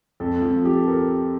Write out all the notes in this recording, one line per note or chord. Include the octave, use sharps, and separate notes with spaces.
F2 A4
F3
F3 G4
A4
A#4